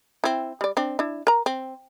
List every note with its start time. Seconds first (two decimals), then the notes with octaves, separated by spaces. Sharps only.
0.24 C4 E4
0.61 G3 D5
0.77 C4 D4
0.99 D4 E4
1.27 A#4 A#5
1.46 C4